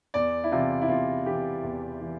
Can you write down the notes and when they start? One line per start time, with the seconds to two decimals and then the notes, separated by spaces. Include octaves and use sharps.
0.14 E2 D5
0.44 E4
0.52 C3 E3 F4
0.82 E4
0.88 E2 F4
1.26 C3 E3 G4
1.63 E2
2.01 E3